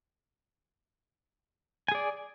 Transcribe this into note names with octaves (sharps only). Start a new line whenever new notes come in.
G#4 D5 G#5